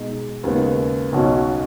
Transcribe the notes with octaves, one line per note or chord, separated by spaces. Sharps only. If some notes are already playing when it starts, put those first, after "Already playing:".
Already playing: B2 G#3 D#4
D#2 C#3 G#3 B3
B1 B2 F#3 C#4 F#4